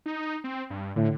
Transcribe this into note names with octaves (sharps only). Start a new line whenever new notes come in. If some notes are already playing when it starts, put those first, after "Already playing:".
D#4
C4
G2
A2 D3